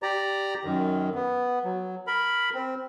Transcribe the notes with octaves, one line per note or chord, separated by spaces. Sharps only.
G4 D5 A#5
F#2 D#3
B3
F#3
A#4 B5
C4